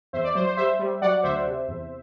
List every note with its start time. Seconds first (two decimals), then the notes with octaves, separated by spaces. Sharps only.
0.13 E2 C5 E5
0.24 D5
0.35 F#3 C5
0.46 C5
0.57 G3 C5 E5
0.79 G3
1.02 F#3 D5 F#5
1.23 D2 C5 E5
1.46 C3
1.68 E2